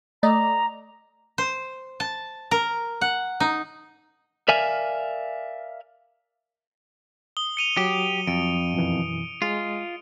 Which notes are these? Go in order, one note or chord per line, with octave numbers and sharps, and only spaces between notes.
A3 D5 D#5 A#5
C5
A5
A#4
F#5
D#4
A#4 D5 E5 F5 G#5
D#6 G7
C#7 D#7 F7
F#3 G4
F2 D7
F#2 B2 E3
G#3 F4 D#5